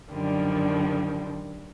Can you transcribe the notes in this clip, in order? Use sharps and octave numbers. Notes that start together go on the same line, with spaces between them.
F#2 D3 D#3 F3 G3